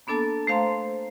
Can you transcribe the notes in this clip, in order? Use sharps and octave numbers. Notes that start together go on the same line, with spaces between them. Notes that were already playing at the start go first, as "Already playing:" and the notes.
A#3 B3 D4 A4 A5 A6
A3 C5 F5 A#5 C6